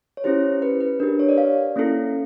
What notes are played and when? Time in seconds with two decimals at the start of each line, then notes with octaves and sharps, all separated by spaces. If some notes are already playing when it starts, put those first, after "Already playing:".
0.17 C#5
0.24 C#4 E4 G4 C5
0.62 B4
0.81 B4
1.00 D4 G4 A#4
1.09 B4
1.19 C#5
1.29 D5
1.38 F5
1.76 A#3 C#4 E4 A4